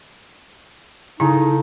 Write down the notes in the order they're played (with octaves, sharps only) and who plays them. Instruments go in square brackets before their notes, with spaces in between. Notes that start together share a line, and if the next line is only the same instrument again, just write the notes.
[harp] C#3 A4 [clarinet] D#4 [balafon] E4